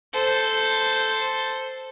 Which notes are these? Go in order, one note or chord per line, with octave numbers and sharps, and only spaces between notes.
A4 C5